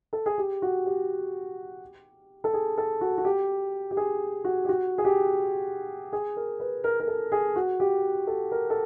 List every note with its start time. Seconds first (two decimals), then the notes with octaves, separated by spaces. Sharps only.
0.13 A4
0.26 G#4
0.38 G4
0.62 F#4
0.86 G4
2.44 A4
2.53 G#4
2.78 A4
3.01 F#4
3.18 F#4
3.25 G4
3.91 G4
3.97 G#4
4.44 F#4
4.65 G4
4.69 F#4
4.98 G#4
5.05 G4
6.13 G#4
6.37 A#4
6.60 B4
6.84 A#4
7.00 A#4
7.07 A4
7.32 G#4
7.56 F#4
7.80 G4
8.27 A4
8.51 A#4
8.70 A4